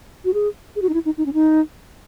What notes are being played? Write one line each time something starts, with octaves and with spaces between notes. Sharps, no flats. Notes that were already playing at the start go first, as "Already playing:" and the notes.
F#4
G#4
G#4
F#4
D#4
E4
D#4
D#4
C#4
D#4